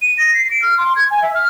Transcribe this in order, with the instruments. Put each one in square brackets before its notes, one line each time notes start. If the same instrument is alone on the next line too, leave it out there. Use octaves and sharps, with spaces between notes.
[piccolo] D#7
A#6
C7
D7
F6
C6
G#6
G#5
E5
F6